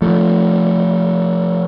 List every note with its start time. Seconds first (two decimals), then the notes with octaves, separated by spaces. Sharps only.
0.02 F3 A3